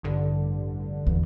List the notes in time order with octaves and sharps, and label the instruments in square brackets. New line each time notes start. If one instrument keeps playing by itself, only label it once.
[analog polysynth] A1 G2 D3
[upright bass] E2 E3